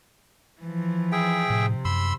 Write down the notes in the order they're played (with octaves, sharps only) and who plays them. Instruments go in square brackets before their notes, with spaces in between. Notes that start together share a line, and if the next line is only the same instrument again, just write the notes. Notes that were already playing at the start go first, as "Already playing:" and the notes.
[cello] E3 F3
[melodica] G#4 E5 G5
[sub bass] A2 [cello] C3
[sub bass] F#2 [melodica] B5 C6 E6